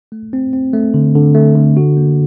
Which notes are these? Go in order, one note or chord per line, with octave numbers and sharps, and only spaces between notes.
A3
C4
C4
A3
D3
D3
A3
D3
F#4
A#3